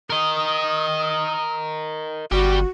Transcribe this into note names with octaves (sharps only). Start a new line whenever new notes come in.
A#4 D#5 D#6
G1 G3 F#4 G4